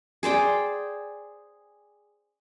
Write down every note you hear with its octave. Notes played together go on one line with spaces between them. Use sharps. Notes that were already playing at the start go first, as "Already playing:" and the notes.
G#4 C5 D5 G5